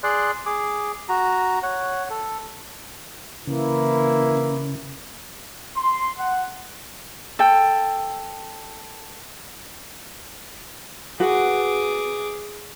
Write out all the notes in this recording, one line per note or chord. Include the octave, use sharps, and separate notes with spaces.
G#4 D5 C6 F#6
G#4 D6
F#4 A#5
C#5 F#5
A4
C#3 E3 A#3 E4
C6
F#5
A4 G5
F#4 G#4 B4 F#5 D6